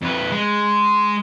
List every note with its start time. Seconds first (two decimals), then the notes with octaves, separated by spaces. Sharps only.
0.02 F2 B4
0.32 G#3